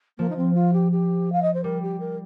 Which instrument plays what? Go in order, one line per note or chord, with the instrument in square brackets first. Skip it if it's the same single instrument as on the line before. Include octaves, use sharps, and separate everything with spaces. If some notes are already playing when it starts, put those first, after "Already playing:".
[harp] F3 [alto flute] A#3
[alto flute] D#4
C4
F4
G4
G4
F5
D#5
C5
[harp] G3 [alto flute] A#4
[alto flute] G4
A#4